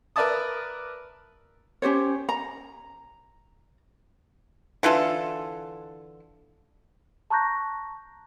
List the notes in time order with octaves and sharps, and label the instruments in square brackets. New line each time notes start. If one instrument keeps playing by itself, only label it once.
[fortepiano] A#4 B4 D5 E5 A5 D#6
[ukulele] C#4 G4 C5 C#5
A#5
[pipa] D3 E3 F4 A4
[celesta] A5 A#5 C#6 F#6 G6 A#6